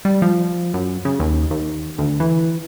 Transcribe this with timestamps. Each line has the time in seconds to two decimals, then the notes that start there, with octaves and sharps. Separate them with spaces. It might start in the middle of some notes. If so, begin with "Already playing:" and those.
0.05 G3
0.22 F3
0.74 F#2
1.05 C#3
1.20 D#2
1.51 D#2
1.98 D2
2.20 E3